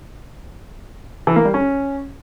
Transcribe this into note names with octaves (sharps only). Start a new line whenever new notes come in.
E3
A#3
G3
C#4